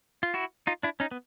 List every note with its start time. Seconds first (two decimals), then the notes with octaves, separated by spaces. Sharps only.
0.23 F4
0.34 E4 F#4
0.67 D#4 F4
0.83 D4 E4
1.00 C#4 D#4
1.11 B3